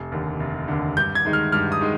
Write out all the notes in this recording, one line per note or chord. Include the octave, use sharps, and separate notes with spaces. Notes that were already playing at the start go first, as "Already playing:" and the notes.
Already playing: F1
D#2 D3
F1
D#2 D3
G2 G6
G#6
D#3 G#3 D#4
F6
G2 F6
D#6
D#3 G#3